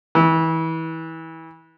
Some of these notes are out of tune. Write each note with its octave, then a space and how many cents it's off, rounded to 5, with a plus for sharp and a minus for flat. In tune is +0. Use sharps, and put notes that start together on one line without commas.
E3 -25